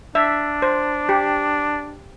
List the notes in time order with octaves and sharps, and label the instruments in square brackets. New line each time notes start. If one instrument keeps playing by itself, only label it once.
[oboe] D4 [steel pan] E5
[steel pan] C5
G4